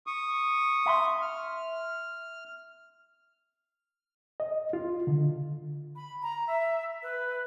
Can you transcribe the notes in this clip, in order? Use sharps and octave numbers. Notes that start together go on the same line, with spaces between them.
C#6 D#6
E5 B5 C6
F6
D#5
F4
D3
B5
A#5
E5
B4